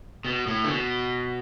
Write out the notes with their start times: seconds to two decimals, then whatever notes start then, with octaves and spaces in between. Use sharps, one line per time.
0.25 B2
0.47 A2
0.64 D3
0.69 B2